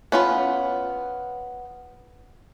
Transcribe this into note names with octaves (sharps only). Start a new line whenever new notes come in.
B3 C#4 F4 B4